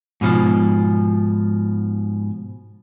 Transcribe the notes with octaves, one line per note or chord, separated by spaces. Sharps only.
G#2 B2 F3